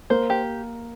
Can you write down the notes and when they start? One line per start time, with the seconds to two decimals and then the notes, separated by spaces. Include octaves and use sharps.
0.10 A#3 C5
0.30 G4